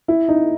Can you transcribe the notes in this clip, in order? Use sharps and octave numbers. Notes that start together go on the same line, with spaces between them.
E4
D#4